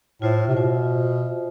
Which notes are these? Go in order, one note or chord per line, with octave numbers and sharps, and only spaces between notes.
A2 F4 C5 E5
C3
B2 F4 C5 E5